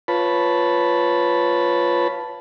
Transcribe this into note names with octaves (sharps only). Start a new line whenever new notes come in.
F4 B4 C#5 A5 B5